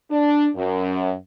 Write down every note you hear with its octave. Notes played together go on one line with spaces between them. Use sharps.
D4
F#2